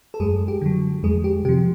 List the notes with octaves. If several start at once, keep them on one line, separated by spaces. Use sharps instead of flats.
A4
F#2 G#3 G#4
G4
D3 F#3
F2 G#3 G#4
G4
C3 F3 G4